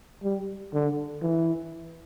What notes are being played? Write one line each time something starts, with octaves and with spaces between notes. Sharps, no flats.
G3
D3
E3